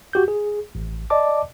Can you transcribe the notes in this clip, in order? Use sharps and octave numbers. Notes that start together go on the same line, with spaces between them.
F#4 G4 G6
G#4
A1
D5 D#5 A5 D6